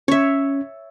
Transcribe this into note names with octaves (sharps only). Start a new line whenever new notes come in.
C#4 C#5 E5